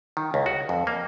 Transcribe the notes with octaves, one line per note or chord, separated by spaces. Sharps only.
D#3
C#2
F#4
F2
A#3